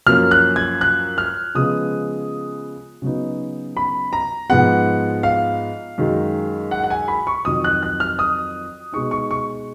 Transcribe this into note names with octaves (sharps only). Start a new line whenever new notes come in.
F#2 F3 A#3 C#4 F6
F#6
G#6
F#6
F6
C#3 F3 G#3 B3 D#6
C#3 F#3 B3 D#4
B5
A#5
G#2 F3 G#3 B3 F#5
F5
F#2 D#3 G#3
F#5
F#5
G#5
B5
C#6
F2 D#3 F#3 D#6
F#6
F#6
F6
D#6
B2 G#3 D#4 C#6
C#6
C#6